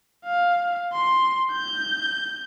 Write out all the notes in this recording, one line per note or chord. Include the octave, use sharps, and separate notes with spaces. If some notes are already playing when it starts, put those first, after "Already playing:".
F5
C6
G6